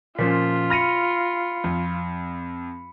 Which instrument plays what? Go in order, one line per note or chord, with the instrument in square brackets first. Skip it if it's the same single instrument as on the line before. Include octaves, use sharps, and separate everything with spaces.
[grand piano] A#2 F3 C#4 [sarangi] F4 [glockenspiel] B6
[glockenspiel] B5 C#7 [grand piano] F6 A#6 D#7
[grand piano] F2